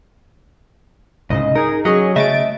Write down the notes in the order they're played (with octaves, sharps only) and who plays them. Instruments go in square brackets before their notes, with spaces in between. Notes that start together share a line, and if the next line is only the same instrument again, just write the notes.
[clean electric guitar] C2 G#2 C#3 [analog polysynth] D#5
[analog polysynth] D#4 G#4 [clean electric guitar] A#4
[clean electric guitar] F#3 [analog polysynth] C#4 G#4 D#5
[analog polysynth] C#3 A6 D7 [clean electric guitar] A3 D#5 E5